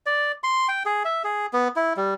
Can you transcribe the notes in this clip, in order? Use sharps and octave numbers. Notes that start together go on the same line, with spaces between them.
D5
C6
G5
G#4
E5
G#4
B3
E4
G3